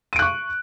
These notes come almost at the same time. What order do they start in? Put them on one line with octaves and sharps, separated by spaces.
D#7 D7 F#6 C#6